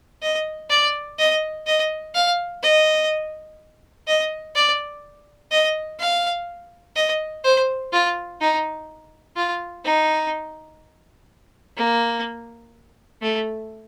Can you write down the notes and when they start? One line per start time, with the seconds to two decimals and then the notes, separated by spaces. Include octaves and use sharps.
0.22 D#5
0.70 D5
1.19 D#5
1.67 D#5
2.14 F5
2.63 D#5
4.07 D#5
4.55 D5
5.51 D#5
5.99 F5
6.96 D#5
7.44 C5
7.93 F4
8.41 D#4
9.36 F4
9.85 D#4
11.77 A#3
13.22 A3